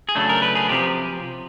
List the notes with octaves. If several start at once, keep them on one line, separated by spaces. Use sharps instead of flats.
G#4
C#3 F#3 A3 D4 A4
A#4
B4
G#4
C3 F3 G4